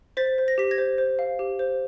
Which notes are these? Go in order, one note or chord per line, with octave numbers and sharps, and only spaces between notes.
C5 A6 B6
C5
A#6
G4 B6
G#6 A#6
C5
C5
F5
G4
C5